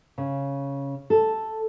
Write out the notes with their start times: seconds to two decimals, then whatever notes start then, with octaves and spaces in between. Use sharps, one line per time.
0.18 C#3
1.10 A4